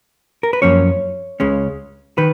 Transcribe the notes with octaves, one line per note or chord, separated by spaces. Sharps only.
A#4
B4
F#2 F3 A#3 C#4 C#5
C#2 C#3 G#3 C#4
D#3 B4